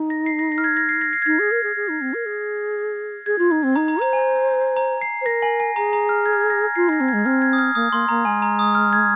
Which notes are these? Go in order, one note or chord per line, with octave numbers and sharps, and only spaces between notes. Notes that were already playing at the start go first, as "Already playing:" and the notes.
Already playing: D#4
A#6
C7
A#6
A#6
F6
G#6
A#6
C7
A#6
C7
G#6
D#4 A#6
G#4
A#4
G#4
G#4
D#4
C4
A#4
G#4
G#4 G#6
F4
D#4
C4
D#4 A#5
A#5
C5 A#5
G#5
A#5
C7
C5
A#4 A#6
G#5
G#5
G#4 A#5
A#5
F6
G#6
F6
G#6
A#6
F4 C7
D#4 A#6
C4
G#6
G#3
C4 F6
G#6
D#6
F6
A#3 D#6
A#3 C6
A#3 A#5
G#3 G#5
A#5
D#6
F6
G#6